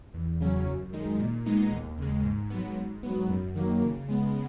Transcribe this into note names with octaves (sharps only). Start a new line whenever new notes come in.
E2
C#3 F#3 C#4
F#2
D#3 G#3 D#4
A#2
G#3 B3 D#4
D#2
C#3 G#3
G#2
F#3 B3
G#2
F#3 B3
F#2
D#3 F#3 A#3
C#3
G#3 B3